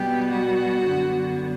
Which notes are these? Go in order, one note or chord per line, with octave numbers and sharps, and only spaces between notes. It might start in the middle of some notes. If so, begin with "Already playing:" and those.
Already playing: B2 G3 B3 G4
F#4
F#2 D3 G3 B3